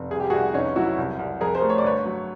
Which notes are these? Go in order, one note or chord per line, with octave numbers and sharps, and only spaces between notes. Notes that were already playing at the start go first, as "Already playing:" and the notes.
Already playing: F1
C2 G#4
G4
C2 F#4 G#4
F1 C#4 D#4
F#3 E4 F#4
C2
C2
F2 G#4 A#4
A#4 C5
A3
C#5
D5
G1 B4 C#5
F#3